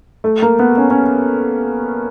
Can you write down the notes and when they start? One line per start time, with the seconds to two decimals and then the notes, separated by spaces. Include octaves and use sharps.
0.24 A3
0.42 A#3
0.59 B3
0.77 C#4
0.91 C#4